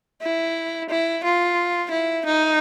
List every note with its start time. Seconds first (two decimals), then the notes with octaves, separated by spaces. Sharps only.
0.22 E4
0.90 E4
1.24 F4
1.91 E4
2.26 D#4